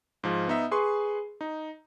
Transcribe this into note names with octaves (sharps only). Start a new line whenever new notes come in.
G#2 F3
B3 D#4 E5
G#4 B4 C6 C#6
D#4